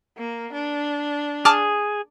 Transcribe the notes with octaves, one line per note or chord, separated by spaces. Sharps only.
A#3
D4
G#4 A5 D6 F6